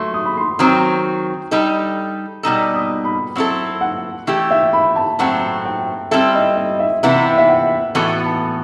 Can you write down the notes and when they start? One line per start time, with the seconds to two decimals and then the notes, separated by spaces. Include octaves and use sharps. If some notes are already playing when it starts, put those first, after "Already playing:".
Already playing: F#3 A3 C6
0.14 D#6
0.26 B5
0.37 C6
0.59 D#3 F#3 C4 D#6
1.51 G3 D#4 A4
2.43 B2 G3 D#4 A4
2.75 D#6
3.05 B5
3.36 F#3 C4 E4 A4
3.81 F#5
4.27 E3 A3 E4 G4
4.51 E5
4.73 B5
4.96 A5
5.19 A2 F#3 A3 C4 F#5
5.65 G5
6.11 G3 C4 E4 A4 E5
6.35 D#5
6.57 D#5
6.80 E5
7.03 C3 E3 B3 E4 E5
7.38 E5
7.49 F#5
7.95 A2 E3 B3 F#4 A4
8.25 A5